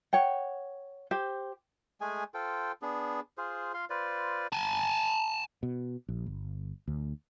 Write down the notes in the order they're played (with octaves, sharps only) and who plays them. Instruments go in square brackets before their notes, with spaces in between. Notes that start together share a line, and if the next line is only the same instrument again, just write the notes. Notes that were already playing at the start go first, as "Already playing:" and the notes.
[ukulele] C#5 F#5 G5
G4 C5
[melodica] G#3 A3 G#4 G#5
F4 A4 C5 G5
B3 D4 G#4
F4 G#4 C5
F4 F5 C6
F4 B4 C5 D5
[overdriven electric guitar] G#5 A5
[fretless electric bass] B2
A#1
G1
D2